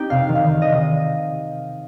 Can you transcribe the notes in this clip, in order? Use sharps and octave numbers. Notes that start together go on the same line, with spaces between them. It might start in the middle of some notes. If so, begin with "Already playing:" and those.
Already playing: C4 D#4 G4
C3 F5
D#3
F5
D#3
D#5
C3